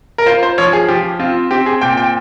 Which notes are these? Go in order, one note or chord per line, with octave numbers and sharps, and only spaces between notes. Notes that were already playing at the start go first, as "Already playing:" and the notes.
A#4
F4 C5
C5
F3 C#5
G#4
F3 G4
C4 F4
C4 G4
G#4
A#2 G5
G5